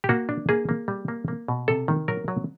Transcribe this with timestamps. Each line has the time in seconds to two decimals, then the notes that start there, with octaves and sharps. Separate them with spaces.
0.04 G4
0.09 A#3 F#4
0.29 D4
0.49 A#3 G#4
0.69 A#3
0.88 G3
1.08 A#3
1.28 A#3
1.48 B2
1.68 C3 A4
1.88 D#3
2.08 F#3 A#4
2.28 F#3